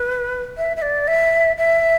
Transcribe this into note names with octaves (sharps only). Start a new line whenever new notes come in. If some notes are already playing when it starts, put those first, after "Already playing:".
Already playing: B4
E5
E5
D5
E5
E5